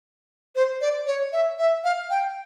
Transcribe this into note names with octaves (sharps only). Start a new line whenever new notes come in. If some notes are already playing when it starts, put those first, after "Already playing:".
C5
D5
C#5
E5
E5
F5
G5